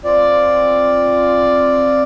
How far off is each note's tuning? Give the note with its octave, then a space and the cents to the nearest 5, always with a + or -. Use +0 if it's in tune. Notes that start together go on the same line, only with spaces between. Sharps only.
C4 +15 F4 +0 D5 +0